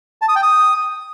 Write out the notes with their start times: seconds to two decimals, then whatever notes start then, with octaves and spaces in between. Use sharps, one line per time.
0.22 A5
0.29 D#6
0.36 G5
0.43 D#6